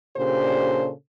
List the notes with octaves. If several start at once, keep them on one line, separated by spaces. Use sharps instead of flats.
A#2 C#3 D4 G4 A4 C5